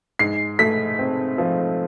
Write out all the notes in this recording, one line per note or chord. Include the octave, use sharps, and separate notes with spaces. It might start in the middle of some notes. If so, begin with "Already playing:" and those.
G#2 C7
A3 B6
C4
F3